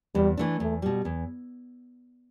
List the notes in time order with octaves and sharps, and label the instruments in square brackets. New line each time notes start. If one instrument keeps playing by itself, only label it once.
[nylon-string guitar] E2 [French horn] G3
[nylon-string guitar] E3 A3 D4
[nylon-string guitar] E2 [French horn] A3
[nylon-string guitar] B2 G3
E2